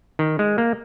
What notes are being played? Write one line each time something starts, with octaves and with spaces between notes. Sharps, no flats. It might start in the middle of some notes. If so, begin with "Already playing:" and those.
D#3
G#3
A#3